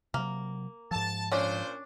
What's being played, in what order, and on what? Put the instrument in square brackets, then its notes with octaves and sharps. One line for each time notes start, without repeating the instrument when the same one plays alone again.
[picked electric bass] C3 F#3 [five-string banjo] A#3
[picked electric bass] G#2 F3 [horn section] A5
[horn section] A#2 C5 [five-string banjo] C#4 D4 D5